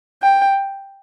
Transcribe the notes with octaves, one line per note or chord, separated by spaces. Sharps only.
G5